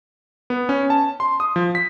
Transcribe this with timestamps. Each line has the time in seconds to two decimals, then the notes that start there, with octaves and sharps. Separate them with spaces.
0.50 B3
0.69 C#4
0.90 A5
1.20 C6
1.40 D#6
1.56 F3
1.75 B6